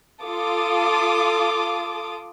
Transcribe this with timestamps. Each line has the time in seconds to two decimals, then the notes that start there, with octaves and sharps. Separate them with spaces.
0.23 F4 A4 D6 D#6